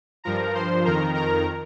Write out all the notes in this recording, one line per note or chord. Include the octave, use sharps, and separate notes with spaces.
G2 F3 A#4 A#5
C5 C6
F2 D#3 A#4 A#5
A#4 A#5